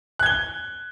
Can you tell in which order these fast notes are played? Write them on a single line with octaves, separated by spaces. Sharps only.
F#6 G#6 G7